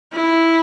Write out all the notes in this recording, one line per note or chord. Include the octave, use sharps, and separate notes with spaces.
E4